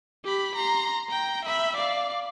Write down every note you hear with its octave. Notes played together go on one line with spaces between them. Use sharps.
G4 B5
A#5 C6
G5 A#5
E5 B5
D5 F5